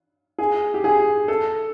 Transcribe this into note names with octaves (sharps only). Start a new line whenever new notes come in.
G#4
G4
G#4
A4